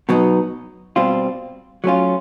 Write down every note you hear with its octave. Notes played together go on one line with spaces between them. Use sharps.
B2 F#3 B3 D#4
B2 G3 C4 F4
F#3 A3 C#4 F4